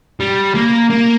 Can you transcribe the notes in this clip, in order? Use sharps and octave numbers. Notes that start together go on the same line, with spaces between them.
G3
A#3
A#3